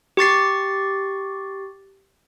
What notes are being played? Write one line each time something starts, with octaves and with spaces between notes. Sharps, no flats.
G4 C#6 A6 C7